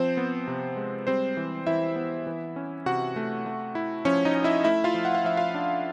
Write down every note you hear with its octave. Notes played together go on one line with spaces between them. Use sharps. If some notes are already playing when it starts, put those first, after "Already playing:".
Already playing: F3 C4 C5
B3
C3
G#3
G3 C4 C5
E3
E3 E4 E5
B3
E3
C#4
C3 F#4 F#5
A3
A3
E4
F3 C#4 C#5
D#4 D#5
C#4
E4 E5
A3 E4 E5
F4 F5
F3
F#5
F5
F3 E5
F4 F5
D4